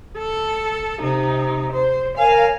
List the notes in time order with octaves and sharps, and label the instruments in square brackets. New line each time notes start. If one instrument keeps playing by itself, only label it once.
[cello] A4
C3 D#4
C5
[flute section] A#4 C#5 G#5 [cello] F5